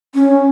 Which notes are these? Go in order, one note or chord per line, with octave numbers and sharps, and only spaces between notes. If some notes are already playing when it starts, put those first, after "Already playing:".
C#4